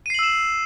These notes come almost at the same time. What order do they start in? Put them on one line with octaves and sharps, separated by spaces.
D#7 C7 F#7 E6 E7